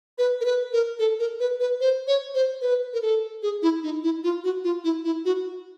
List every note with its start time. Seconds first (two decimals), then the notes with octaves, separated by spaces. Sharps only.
0.18 B4
0.41 A#4
0.45 B4
0.73 A#4
0.99 A4
1.19 A#4
1.40 B4
1.60 B4
1.81 C5
2.07 C#5
2.34 C5
2.62 B4
2.93 A#4
3.02 A4
3.43 G#4
3.62 E4
3.83 D#4
4.03 E4
4.24 F4
4.44 F#4
4.64 F4
4.84 E4
5.05 E4
5.25 F#4